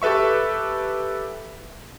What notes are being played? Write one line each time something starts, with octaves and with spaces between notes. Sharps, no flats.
G4 A4 B4 E5 C#6